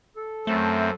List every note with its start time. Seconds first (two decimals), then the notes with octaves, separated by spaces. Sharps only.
0.16 A4
0.47 F#2 A3 C4